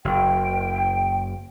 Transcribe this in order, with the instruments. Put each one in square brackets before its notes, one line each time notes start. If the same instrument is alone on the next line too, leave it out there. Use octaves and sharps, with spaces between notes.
[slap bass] F#1 [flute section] G5